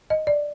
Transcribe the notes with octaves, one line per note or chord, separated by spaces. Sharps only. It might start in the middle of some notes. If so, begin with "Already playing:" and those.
D#5
D5